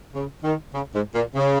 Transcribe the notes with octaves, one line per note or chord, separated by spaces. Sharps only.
C#3
D#3
C#3
G#2
A#2
C#3